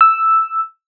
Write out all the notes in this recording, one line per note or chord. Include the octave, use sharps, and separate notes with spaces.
E6